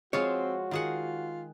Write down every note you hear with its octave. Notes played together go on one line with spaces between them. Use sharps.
F3 G#3 C4 F4 F#4 C#5
D#3 F4 G#4 F#5